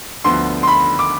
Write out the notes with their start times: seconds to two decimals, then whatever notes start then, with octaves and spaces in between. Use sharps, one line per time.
0.24 D2 D3 F3 B3 C6
0.63 C6
0.68 B5
0.99 D6